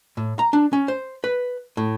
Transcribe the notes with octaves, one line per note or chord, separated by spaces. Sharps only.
A2
A#5
D4
C#4
C5
B4
A2